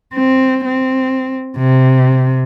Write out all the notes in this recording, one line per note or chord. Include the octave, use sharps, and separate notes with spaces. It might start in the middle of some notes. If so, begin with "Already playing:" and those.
C4
C4
C3